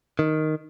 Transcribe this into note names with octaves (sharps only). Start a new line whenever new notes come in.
D#3